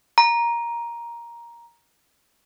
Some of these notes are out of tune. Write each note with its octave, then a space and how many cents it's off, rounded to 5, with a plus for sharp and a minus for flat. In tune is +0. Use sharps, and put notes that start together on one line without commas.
A#5 +10